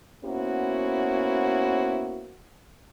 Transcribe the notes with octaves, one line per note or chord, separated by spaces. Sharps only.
A#3 B3 C#4 E4 F#4 C5